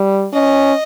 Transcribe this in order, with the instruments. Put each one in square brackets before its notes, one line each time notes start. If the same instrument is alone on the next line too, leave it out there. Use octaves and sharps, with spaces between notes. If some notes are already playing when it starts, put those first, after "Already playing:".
Already playing: [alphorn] G3
[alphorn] C#4 [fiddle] D#5